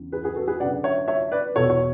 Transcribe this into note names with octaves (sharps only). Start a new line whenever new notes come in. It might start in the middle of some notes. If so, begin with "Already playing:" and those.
Already playing: E2 C#3 E3
G#4 B4
G#4 B4
F#4 A4
G#4 B4
F#2 D3 D5 F#5
C#5 E5
C#5 E5
B4 D5
E2 B2 A4 C#5
C#5